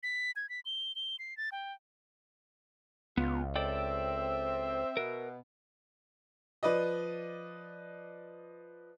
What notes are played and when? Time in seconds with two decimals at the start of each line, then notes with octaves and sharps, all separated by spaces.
0.03 B6
0.36 G#6
0.49 B6
0.65 G7
0.95 G7
1.19 C7
1.37 A6
1.52 G5
3.17 C#2 B3 F4
3.56 C4 A4 D5 E5 G5
4.97 B2 A#4
6.63 F3 B4 D5 D#5